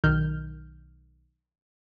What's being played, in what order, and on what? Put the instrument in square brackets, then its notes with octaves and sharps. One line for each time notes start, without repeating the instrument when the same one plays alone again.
[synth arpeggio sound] B1 D#3 F6 G6